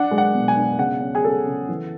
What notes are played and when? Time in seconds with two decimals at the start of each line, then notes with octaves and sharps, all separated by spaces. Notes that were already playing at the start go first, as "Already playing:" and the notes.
Already playing: D4 F#5
0.11 G#3
0.18 F#5
0.34 B2
0.48 G#5
0.56 D4
0.78 C#3 F#5
1.00 C#4
1.15 G#4
1.24 C#4 A4
1.47 C#3
1.69 E3